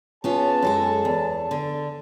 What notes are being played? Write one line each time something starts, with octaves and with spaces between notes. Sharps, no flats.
B3 C#4 F4 G#4 C#5 A5
F#2 G#3 A4
E2
D3